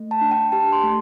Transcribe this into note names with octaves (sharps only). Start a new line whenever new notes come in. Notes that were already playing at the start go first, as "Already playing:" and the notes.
Already playing: A3
A5
D4
G5
G4 A5
C6
A3